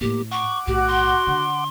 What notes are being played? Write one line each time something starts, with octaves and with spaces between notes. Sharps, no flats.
A2 A#3 C4 G4
F#5 C#6 D6
B1 A2 F#4 G4
C6
D3